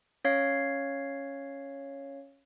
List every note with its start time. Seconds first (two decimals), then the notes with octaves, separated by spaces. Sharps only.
0.24 C#4 C#5 F5 C7